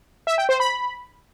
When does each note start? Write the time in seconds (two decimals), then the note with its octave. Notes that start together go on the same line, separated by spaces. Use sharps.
0.27 E5
0.38 G5
0.49 C5
0.60 B5